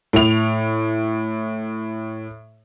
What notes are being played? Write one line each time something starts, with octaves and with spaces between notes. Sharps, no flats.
A2 F7